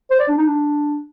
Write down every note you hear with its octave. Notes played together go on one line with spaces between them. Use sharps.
C5
D5
D4
D#4
D4